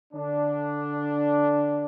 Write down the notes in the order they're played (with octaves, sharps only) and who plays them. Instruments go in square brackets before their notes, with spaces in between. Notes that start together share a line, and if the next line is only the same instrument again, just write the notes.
[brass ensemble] D3 D4